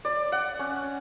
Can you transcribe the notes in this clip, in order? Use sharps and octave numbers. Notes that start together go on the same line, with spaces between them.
D5
F#5
C#4